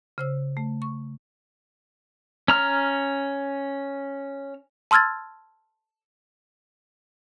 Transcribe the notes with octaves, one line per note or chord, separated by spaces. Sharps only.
C#3 C5 E6
A3
C#6
C#4 A#5 F6
A5 C6 E6 F6 G#6 A6